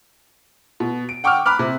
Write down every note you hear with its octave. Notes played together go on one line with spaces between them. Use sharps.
B2
D7
F#5 G5 C#6 D6 E6 F6
B5 D6 F6 F#6
C3